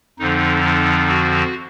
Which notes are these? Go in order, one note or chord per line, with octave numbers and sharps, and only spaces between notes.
F2 D3 F3 D#4
D#4
F#4